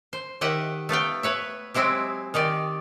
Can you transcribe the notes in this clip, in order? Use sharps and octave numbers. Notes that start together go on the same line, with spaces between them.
C5
D#3 G4 D#5 E5 F#5
A3 B3 F5 G5
B4 C#5 E5
F#3 G#3 C4 E4 G4
D#3 D#4 G4 D5